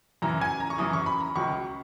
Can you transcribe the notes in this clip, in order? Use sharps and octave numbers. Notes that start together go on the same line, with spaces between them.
F#2 C#3 E3 A#5
G#5
A#5
C#6
F#2 C#3 E3 D#6
C#6
B5
A#5
C#2 C#3 F#3 C#6